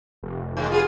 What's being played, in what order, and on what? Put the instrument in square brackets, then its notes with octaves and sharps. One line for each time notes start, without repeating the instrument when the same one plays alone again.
[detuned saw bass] F1
[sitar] G2 D#3 G#3
B3 F4 G#4